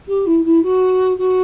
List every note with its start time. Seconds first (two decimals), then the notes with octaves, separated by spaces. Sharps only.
0.07 G4
0.26 E4
0.44 E4
0.63 F#4
1.18 F#4